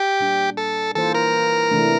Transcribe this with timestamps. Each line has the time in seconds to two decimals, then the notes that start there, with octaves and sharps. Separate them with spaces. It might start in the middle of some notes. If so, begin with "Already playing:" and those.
Already playing: G4
0.20 A#2 G3 D4
0.57 A4
0.95 E3 A#3 F4 A4 C5
1.15 A#4
1.71 C3 E3 A3 D4